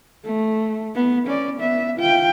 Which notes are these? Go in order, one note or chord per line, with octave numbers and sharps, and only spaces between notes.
A3
B3
C#4 D5
B3 E5
F4 G5